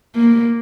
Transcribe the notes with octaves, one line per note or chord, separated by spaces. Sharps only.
A#3